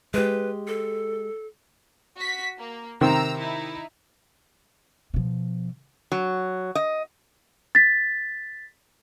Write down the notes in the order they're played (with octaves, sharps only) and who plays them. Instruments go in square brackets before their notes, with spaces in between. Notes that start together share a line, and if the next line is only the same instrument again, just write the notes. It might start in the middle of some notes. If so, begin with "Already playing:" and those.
[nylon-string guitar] G#3 G4 [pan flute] B4
[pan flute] A4
[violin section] F#4 B6
A#3
[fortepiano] C3 D#3 C4 [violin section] A#5 E6
[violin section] D#4 E4
[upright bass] B2 F3
[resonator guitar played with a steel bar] F#3
D#5
[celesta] A6 B6